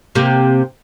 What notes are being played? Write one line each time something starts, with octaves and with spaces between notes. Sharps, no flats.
C3 A#3